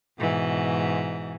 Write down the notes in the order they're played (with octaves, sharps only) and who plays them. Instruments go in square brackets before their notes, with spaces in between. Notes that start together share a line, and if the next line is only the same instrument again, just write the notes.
[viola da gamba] G#2 B2 E3